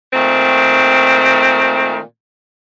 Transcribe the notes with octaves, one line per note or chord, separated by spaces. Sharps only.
A#2 D#3 A3 C4